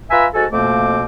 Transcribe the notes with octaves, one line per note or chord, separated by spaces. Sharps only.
F4 B4 E5 G#5 A#5 B5
G#2 F#4 A4 G#5 A5
F2 B2 A3 A#3 C4 D6